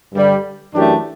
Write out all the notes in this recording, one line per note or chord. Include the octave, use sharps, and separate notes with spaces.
G2 D3 G3
F#2 E3 A3 D4 G4